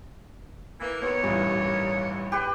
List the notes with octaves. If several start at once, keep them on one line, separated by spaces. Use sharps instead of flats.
E3 A#3
D#2 B3 C#5
A1 G2 A#2
G4 B4 G5